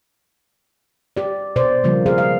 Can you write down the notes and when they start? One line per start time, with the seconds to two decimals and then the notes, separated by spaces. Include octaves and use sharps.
1.17 G4 D5
1.56 B2 C5 D5
1.84 C#3 F3 G3 A#3
2.06 G#4 A#4 C5 F5
2.18 F5